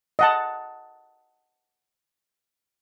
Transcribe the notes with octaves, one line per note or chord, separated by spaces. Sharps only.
D#5 F#5 A5